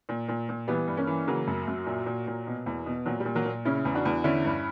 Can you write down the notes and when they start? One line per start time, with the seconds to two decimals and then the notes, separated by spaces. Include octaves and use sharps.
0.09 A#2
0.28 A#2
0.49 A#2
0.68 E3 G3 B3
0.88 G2
0.97 A#3 C#4
1.07 E3
1.27 C#3 F#3 A#3
1.47 F#2
1.67 F#2
1.86 A#2
2.06 A#2
2.27 A#2
2.47 B2
2.66 E2
2.86 B2
3.06 A#2 F#3
3.20 G3
3.25 A#2
3.35 F#3 A#3
3.45 A#2
3.65 C#3 C#4 E4
3.85 E2
3.94 D4 F#4
4.05 E2
4.24 D3 C#4 E4
4.45 G2